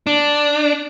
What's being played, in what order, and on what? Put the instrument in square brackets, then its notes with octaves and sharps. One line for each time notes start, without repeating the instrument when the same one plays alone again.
[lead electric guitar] D4